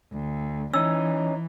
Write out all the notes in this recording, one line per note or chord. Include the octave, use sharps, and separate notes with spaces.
D2
E3 C#4 D#4 E6